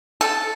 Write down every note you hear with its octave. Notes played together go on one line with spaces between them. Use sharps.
A4